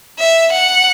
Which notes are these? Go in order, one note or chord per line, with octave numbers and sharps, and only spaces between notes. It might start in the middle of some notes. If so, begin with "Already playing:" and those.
E5
F#5